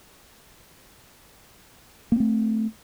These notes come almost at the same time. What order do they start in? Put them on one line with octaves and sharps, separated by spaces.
A#3 C4 A3